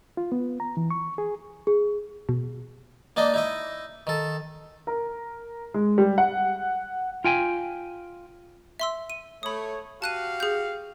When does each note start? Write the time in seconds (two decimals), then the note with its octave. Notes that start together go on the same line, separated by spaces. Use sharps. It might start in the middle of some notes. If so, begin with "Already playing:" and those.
0.17 F4
0.32 B3
0.60 A#5
0.77 E3
0.91 C#6
1.18 G#4
1.67 G#4
2.29 B2
3.16 A#3 D4 D#4 D#5
3.34 D#4 E4 D#5
4.07 D#3 A4
4.87 A#4
5.74 G#3
5.98 G3
6.18 F#5
7.24 F4 G5 G#5
8.80 E5 C6 E6
9.10 D#7
9.43 A3 C#5 B5 D#6
10.02 F#4 G4 F5 A5 F#6 D#7
10.40 G#4 G6